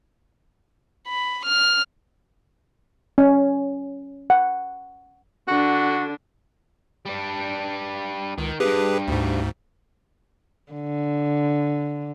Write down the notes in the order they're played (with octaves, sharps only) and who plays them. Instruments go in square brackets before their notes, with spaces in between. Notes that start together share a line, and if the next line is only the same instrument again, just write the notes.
[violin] B5
F6
[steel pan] C#4
F#5
[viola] D3 D4 [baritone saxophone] F#4
[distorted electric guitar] G3 D4
[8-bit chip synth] C#2 [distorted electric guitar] D#3
[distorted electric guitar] E2 G2 [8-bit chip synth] G4 G#4 B4
[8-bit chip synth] D2 G#2
[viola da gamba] D3